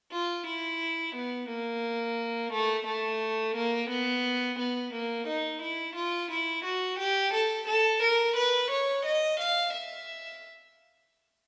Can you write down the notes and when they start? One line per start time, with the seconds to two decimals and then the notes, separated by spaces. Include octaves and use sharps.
0.12 F4
0.47 E4
1.16 B3
1.49 A#3
2.53 A3
2.87 A3
3.56 A#3
3.90 B3
4.59 B3
4.94 A#3
5.27 D#4
5.62 E4
5.96 F4
6.31 E4
6.65 F#4
6.99 G4
7.34 A4
7.68 A4
8.02 A#4
8.37 B4
8.71 C#5
9.06 D#5
9.40 F5
9.74 E5